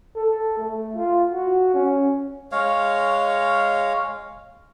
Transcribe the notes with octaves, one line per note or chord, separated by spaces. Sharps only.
A4
A3
F4
F#4
C#4
G#3 C#5 F5